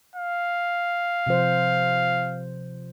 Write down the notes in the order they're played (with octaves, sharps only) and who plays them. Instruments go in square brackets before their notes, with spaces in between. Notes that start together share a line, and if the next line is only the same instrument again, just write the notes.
[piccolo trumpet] F5
[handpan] C3 F3 C5